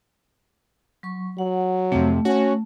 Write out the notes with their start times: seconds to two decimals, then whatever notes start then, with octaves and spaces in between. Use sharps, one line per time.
1.03 F#3 C#6
1.38 F#3 F#5
1.92 F2 C3 A3
2.25 C#4 F#4